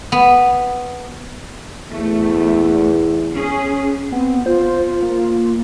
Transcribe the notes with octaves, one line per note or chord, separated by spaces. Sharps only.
B3
E2 A3
C#4 G#4
B3 C4
F4 C5
A#3